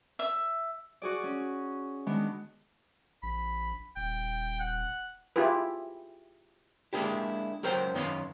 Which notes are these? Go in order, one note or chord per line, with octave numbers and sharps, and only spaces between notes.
E5
F#4 G#4 D5
C#4
D#3 G#3 B3 D4
A#1 B5
D#1 G5
F#5
E4 F4 G4 G#4 B4
G#3 A#3 D4 E4 G4
C#2 F#3 A#4 C5 G5
F#2 D#3 B3 C#5 F5 C6